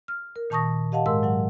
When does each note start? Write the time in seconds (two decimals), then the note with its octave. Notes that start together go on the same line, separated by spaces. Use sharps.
0.08 F6
0.36 A#4
0.50 A#2 D#3 A5 C#6 D#6 A#6
0.92 G4 D#5 F5 F#5 A5
1.06 G#2 G#3 A#4 C6 E6
1.23 F#3 F#5